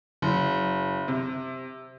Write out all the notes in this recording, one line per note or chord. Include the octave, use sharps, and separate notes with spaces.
F#1
C3